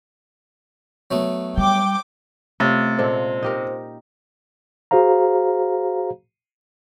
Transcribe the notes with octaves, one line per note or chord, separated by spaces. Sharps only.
F#3 A3 B3
G3 G5 D6
C3 A3 C#4 F4 A6
A#2 G#3 A4 C5
D#4 G4 A#4
F#4 G#4 C5 F5 A#5